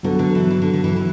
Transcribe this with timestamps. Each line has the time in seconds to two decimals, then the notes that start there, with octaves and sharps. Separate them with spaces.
0.03 D3 F#3 B3 F#4 A4
0.19 D3
0.35 E3
0.51 E3
0.62 D3
0.74 D3
0.84 E3
0.96 E3